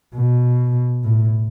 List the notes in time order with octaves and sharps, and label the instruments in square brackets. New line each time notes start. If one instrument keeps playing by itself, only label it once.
[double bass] B2
A2